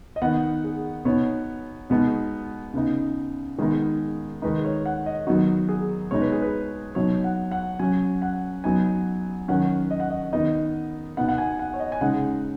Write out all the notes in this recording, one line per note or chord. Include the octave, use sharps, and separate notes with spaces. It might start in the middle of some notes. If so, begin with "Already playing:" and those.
D#5
D#3 B3 D#4 F#5
G#4
B2 B3 D#4 C#5
B2 G#3 B3 D#4
C#3 B3 D#4
D#3 G#3 B3 D#4 G#4
D#3 G#3 D#4 B4
C#5
F#5
D#5
D#3 F#3 B3 D#4 F#4
G#4
B2 G#3 D#4 C#5
B4
G#4
B4
B2 F#3 D#4 C#5
F#5
F#5
F#3 C#4 G#5
F#5
F#3 B3 D#4 G#5
D#3 F#3 C#4 F#5
D#5
F#5
D#5
D#3 B3 D#4 D#5
B2 B3 D#4 F#5
F#5
G#5
F#5
C#5
D#5
G#5
C#3 G#3 D#4 F#5